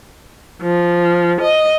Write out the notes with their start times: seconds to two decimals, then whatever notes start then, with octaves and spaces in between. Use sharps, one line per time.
0.62 F3
1.41 D#5